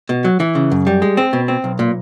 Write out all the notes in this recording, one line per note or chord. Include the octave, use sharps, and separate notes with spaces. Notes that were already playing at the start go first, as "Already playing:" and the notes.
B2
F#3
E3
C#3
F#2
G3
G#3
C4
B2
C4
B1
A#2